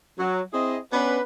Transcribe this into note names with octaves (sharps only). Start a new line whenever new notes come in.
F#3
C4 E4 G#4 D#5
B3 C#4 D4 B4